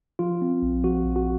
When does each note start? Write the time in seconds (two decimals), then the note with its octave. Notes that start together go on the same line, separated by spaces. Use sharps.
0.19 F3 F4
0.42 C4
0.63 A#1
0.84 F3 F#4
1.06 A#1
1.16 F#4